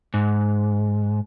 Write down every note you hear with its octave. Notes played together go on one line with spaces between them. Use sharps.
G#2